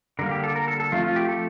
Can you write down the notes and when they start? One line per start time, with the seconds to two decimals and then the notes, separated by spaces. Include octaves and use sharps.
0.19 D3 G3 A#3 A#4
0.31 G4
0.44 A4
0.56 A#4
0.68 A4
0.80 A4
0.92 F3 A3 C4 F4
1.04 F4
1.16 G4
1.28 A4